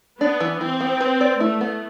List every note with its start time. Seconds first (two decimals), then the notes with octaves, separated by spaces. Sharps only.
0.21 B3 D4
0.40 E3
0.61 E3 C4
0.81 B3
1.01 B4
1.21 D5
1.40 A3 E4
1.61 B3